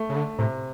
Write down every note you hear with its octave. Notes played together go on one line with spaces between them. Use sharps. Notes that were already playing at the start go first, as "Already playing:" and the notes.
Already playing: A3
C#3
D3
A2 C3